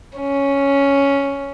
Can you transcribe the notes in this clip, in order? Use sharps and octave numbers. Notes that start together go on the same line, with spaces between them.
C#4